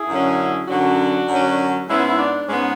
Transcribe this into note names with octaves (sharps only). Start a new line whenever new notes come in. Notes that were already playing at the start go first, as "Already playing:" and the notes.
Already playing: E4 G#4
F#2 D3 F#3 C#4
F#2 D3 F#3 C#4 D4 F#4
F#2 D3 F#3 C#4
G#2 G#3 B3 C#4 E4
E4
D4
G#2 G#3 B3 C#4